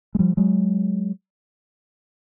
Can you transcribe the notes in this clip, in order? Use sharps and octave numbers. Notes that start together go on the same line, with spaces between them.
G#3
F3 G3
F#3 G#3